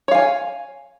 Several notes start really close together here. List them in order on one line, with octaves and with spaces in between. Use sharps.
C#5 F5 G#5